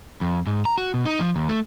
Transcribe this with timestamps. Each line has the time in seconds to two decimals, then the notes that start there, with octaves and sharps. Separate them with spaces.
0.21 F2
0.47 G#2
0.65 A#5
0.78 F#4
0.94 B2
1.05 D#4
1.20 F3
1.36 D#2
1.49 A3